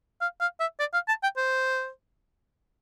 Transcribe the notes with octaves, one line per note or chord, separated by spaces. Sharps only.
F5
F5
E5
D5
F5
A5
G5
C5